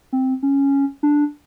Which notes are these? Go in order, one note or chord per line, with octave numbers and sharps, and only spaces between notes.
C4
C#4
D4